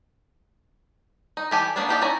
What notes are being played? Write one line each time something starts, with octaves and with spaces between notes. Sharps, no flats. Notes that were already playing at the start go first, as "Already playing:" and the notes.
D#4
E3 G3 G4 A4 G#5
A#3 B3 C#4 D4
A#3 D#4 G4 A4 D5
C#4 E4 D5 A#5